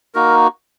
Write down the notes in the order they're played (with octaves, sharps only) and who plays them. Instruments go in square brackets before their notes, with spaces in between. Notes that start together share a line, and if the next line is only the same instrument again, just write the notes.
[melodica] A#3 D#4 F#4 A#4